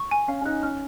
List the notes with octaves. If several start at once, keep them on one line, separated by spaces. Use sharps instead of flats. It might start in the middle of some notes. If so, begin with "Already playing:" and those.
Already playing: C#6
G#5
C#4 F5
C#4
D#4 F#6
C#4 F6